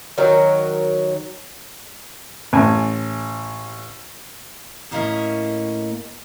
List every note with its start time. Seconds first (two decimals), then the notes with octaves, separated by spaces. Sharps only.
0.18 D#3 F#3 D#4 A#4
2.53 A1 G#5 A5
4.91 A2 A#3 C#4 E4 D#5 E5